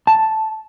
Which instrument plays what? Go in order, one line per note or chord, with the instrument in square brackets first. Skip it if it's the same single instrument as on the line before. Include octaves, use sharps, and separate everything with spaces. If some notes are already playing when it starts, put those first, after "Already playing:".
[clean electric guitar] A5